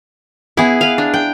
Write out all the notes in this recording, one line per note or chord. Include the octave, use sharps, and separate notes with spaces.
B3 E4 G#4
B4 F5
D4
G5